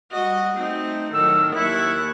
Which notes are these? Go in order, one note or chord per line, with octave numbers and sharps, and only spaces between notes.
G3 F#4 D#5
A3 C4 D#4
A2 D#3 F#3 E6
D#2 E4 C#6 F#6